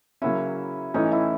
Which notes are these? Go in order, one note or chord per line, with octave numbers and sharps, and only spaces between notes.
C#3 F#3 A#3 C#4 E4
A1 A2 E3 A3 C#4 D#4
E4